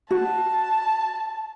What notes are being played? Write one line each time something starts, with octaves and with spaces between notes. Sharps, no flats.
F#4 A5